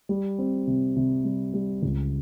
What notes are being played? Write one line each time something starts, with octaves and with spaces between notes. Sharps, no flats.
G3
C4
C3
C3
G3
G3
C#2